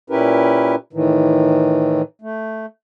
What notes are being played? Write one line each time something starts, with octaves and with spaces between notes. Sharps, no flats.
A#2 C#4 E4 G4 A#4 B4
A2 D#3 E3
A3